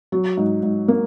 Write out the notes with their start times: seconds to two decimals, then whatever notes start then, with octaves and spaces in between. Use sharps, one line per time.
0.12 F#3
0.37 G#2
0.63 G#2
0.88 A#3